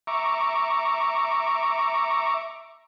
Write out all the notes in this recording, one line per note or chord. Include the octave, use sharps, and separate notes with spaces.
E5 A#5 C#6 D6